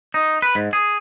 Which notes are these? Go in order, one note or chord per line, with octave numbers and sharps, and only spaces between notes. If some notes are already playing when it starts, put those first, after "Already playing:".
D#4
B4
G#2
G#4